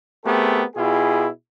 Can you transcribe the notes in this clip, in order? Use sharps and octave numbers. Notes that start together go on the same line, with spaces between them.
A3 B3 C4 G4 G#4 A#4
B2 E4 F4 G4 G#4